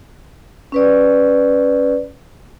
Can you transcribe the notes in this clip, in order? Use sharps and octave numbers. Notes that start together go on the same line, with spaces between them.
C#4 B4 D5